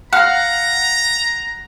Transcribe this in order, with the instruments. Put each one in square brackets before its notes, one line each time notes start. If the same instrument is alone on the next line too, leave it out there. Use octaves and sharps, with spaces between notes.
[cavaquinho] F5 [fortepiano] F#5 [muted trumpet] A#5